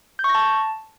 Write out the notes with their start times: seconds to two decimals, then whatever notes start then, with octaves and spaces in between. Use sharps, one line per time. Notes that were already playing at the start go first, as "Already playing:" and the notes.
0.19 G6
0.24 C#6
0.29 A#6
0.35 A5